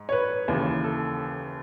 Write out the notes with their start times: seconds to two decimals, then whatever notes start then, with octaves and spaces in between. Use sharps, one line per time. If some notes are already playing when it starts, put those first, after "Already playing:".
Already playing: G#2
0.09 C#5
0.12 B4
0.48 D#2 C#3 E3
0.84 A4